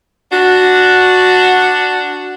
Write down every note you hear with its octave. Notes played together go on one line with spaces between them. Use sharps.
D4 F#4